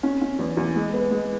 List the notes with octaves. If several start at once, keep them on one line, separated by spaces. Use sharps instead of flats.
C#4
C#4
E2
E2
G#3
B3
G#3